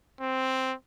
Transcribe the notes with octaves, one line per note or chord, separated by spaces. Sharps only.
C4